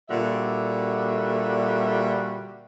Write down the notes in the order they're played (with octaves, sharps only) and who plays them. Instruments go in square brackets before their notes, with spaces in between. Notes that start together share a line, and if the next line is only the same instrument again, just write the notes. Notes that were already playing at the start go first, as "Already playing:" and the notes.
[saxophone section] A#2 D3 G3 F#4 E5